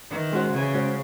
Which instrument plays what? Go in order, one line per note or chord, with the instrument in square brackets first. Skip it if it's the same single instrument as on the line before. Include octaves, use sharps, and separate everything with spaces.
[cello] D#3 [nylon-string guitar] E3
[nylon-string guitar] G#3 C#4 F#4 C5
[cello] C#3 [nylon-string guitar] E3
[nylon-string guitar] G#3 C#4 F#4 C5